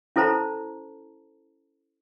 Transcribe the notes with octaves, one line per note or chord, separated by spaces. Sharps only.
C#4 E4 A4 C5 A5 A#5